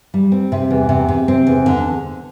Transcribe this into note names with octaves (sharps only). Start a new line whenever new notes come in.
G3
C4
C3
E2
C3
C3
C4
E2
D3